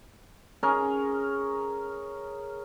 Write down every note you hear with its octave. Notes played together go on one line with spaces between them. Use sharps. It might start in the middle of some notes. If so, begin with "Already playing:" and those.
C#4 G#4 A#4